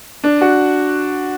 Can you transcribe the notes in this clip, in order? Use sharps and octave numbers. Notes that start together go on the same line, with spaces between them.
D4
F#4